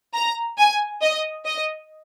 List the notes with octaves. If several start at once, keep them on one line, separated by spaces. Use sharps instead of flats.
A#5
G#5
D#5
D#5